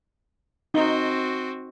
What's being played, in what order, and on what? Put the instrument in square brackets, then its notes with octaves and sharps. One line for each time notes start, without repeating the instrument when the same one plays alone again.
[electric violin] C4 F#4 [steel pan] D#4